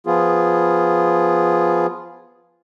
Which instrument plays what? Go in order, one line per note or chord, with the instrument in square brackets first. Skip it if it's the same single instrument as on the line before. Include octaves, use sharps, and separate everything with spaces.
[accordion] F3 B3 F4 G#4